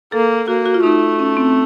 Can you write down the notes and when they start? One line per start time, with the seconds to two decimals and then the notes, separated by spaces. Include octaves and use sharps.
0.12 A#3 A4
0.48 A#3 F#4
0.66 F#4
0.74 F4
0.83 A3 D#4
1.19 C#4
1.37 C4